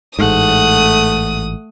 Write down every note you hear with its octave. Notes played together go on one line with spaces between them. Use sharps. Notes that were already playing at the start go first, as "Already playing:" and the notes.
A1 G#2 A3 F#5 D#6